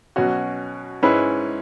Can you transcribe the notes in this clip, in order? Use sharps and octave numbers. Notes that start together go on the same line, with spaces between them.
B2 F#3 C#4 F#4
G#2 G#3 C#4 E4 B4